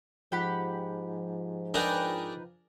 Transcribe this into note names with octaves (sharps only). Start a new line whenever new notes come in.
G#2 F3 G4 F#5 B5
D4 D#4 G#4 A#4 B4 G5